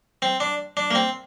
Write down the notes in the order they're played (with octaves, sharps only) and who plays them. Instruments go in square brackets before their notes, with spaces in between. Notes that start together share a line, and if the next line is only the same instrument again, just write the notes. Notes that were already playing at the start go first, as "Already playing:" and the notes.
[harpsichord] C4
D4
D4
A#3
C4